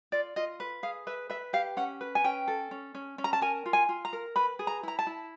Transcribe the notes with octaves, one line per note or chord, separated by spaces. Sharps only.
F4 D5
F4 D#5
B4
G#4 F5
B4 E5
B4 E5
G4 F5
C#4 F#5
B4
G#5
C#4 G5
A4
C#4
C#4
C#4
A#5
A5
A#4 G#5
F4
G#5
F4
A#5
A#4
B4 B5
G#4
A#5
E4 A#5
A5
E4